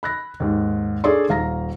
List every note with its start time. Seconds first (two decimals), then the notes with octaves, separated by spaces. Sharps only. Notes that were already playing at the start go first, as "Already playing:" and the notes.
0.03 B5 F#6 A#6
0.40 D#2 G#2
1.04 D4 G#4 A4 C#5 D5 C6
1.29 D#1 F5 A#5 A#6